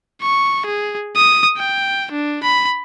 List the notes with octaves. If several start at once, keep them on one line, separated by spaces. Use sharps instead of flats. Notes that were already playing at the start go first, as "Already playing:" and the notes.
C#6
G#4
D#6
G5
D4
B5